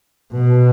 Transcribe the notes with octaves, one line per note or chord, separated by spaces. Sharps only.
B2